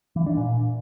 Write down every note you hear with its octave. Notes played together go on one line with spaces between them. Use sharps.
E3
D4
A#2